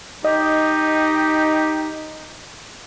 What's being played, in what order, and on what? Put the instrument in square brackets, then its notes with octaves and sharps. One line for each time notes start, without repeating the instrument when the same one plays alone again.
[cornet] D#4 [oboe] G4 [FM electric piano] D#5